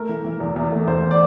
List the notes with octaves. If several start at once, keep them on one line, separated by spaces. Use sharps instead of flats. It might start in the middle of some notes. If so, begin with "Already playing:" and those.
Already playing: A3 A#4
E3
E3
E2
E2
A3
E2 C5
D5